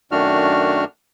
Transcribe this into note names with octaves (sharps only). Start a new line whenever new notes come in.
F#2 D#3 A3 D4 F#4 F6